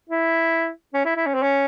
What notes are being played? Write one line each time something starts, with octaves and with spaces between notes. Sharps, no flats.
E4
C#4
E4
E4
C#4
C4
C#4